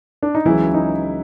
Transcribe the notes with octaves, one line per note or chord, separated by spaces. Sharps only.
D4
D#4
C#2 C#3 E3 F#3 E4
D#4